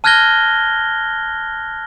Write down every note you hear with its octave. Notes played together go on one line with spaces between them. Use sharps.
A5 F6 F#6 G#6 A#6 G7